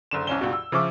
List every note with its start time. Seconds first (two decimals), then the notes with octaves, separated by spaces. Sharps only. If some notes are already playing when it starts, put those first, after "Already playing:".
0.11 F#1 D3 E7
0.27 C2 C#4 G7
0.41 C#2 G2 B2
0.53 E6
0.72 C#3 F3 E5 C#6 D6 E6